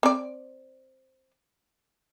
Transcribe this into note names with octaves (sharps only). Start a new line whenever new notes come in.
C4 D5